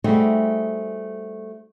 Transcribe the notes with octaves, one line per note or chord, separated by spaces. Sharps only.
G3 A3 C4 D#4 F#4 G#4